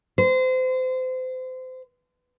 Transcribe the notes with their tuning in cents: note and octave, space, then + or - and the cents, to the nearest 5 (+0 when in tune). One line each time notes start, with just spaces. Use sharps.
C5 -30